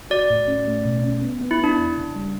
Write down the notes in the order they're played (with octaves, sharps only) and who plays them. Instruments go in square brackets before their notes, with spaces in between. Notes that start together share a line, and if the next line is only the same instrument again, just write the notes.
[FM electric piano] F#4 [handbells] D5
[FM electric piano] A2
C#4
A3
B2
C#4
B3
B3
[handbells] E4
[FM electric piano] B3 [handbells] D4
[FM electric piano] E2
C#3
G3